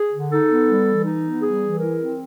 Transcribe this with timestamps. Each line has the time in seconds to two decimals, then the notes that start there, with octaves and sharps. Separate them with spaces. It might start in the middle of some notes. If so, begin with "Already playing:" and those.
Already playing: G#4
0.12 D3
0.30 D#4 A4
0.49 B3
0.68 G3
0.86 E3
1.04 D#4
1.23 B3
1.41 G3 G#4
1.61 E3
1.79 E4 A#4
1.98 C4